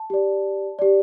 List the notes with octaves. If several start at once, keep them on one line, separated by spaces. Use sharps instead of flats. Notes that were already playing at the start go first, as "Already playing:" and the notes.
Already playing: A5
G4 D5
G4 D5